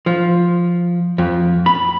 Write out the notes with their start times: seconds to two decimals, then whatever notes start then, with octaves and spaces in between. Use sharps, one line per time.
0.06 F3
1.18 F2
1.66 B5